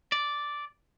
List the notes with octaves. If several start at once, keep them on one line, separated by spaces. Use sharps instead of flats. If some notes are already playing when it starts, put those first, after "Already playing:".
D5